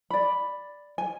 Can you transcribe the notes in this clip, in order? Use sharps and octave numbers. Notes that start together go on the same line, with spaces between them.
D5 B5
G#5